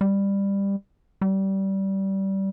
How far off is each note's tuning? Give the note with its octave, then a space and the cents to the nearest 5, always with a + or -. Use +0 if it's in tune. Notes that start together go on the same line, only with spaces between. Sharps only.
G3 +15
G3 -20